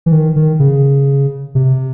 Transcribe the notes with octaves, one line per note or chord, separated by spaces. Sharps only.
E3
D#3
D#3
C#3
C3